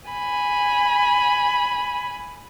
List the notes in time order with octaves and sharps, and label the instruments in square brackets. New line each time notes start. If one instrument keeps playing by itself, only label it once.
[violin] G#5 B5